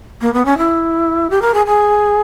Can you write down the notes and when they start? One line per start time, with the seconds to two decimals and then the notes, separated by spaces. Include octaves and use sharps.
0.22 A#3
0.33 B3
0.45 C#4
0.58 E4
1.30 G4
1.42 A#4
1.54 G#4
1.67 G#4